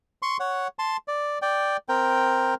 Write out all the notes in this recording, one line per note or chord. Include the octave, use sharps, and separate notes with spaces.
C6 C#6
C#5 F#5
A5 C6
D5
D5 G5
C4 A#4 G5